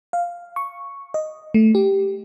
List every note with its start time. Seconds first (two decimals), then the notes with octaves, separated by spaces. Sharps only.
0.13 F5
0.56 C#6
1.14 D#5
1.54 A3
1.75 G4